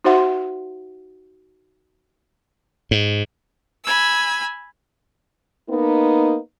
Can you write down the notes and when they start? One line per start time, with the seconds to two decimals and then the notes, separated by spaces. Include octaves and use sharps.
0.05 D#4 F#4 C5 E5 F#5 C6
2.91 G#2
3.85 G#5 B5 E6
5.70 A#3 B3 D#4